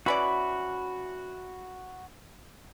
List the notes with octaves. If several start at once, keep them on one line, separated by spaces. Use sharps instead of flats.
E3 C#4 F#4 D5 B5